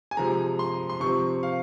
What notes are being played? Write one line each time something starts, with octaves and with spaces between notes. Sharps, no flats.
G#5
C3 F3 G#3 A#5
C6
C6
C3 F3 C4 C#6
F5